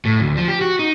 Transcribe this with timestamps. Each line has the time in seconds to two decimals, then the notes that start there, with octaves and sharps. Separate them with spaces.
0.05 A2
0.20 D2
0.37 F3
0.48 G4
0.61 F#4
0.79 D#4